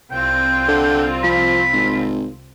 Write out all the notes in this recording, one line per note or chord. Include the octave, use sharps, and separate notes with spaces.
C2 C4 F4 G5
D3
F3 B5
G#1